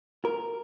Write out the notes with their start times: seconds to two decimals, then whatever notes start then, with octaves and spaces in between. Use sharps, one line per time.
0.25 A#4